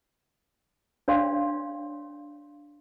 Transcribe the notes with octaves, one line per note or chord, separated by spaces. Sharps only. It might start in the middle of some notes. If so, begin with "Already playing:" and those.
D4 C#5 D5 F5 G5 C6